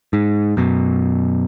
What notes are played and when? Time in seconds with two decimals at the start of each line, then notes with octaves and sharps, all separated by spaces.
0.13 G#2
0.57 F#2 B2